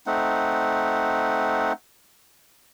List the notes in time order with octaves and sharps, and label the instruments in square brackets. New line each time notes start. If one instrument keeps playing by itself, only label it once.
[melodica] A3 C4 D#4 F#5